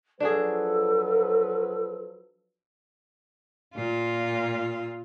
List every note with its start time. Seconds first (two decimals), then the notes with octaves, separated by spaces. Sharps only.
0.20 F3 F#3 D4 F#4 G#4 A4 B4
3.75 A#2 F4